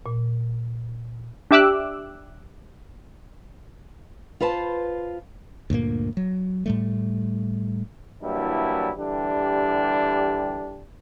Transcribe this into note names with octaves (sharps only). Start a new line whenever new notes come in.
A#2
D4 G4 E5 D6 E6 F#6
F4 B4 C5 A5
D2 G2 A#2 A#3
F#3
A2 G3 A3
E3 F#3 G3 A#3 D4 E4
D3 E3 G3 D4 G4